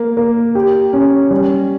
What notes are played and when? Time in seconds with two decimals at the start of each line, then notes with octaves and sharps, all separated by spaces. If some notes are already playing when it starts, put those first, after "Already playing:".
Already playing: A#3
0.17 A#3
0.55 G4
0.93 C#4
1.31 G3